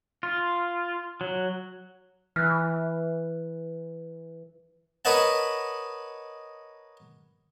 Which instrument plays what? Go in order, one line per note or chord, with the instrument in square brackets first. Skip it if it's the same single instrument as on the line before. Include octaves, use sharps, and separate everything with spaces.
[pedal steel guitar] F4
F#3
[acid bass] E3 [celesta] F6 F#6
[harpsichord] A#4 B4 C#5 D#5 F#5 A5